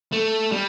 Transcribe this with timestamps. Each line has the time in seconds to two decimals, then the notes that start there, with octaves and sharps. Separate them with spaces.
0.12 A3
0.52 G3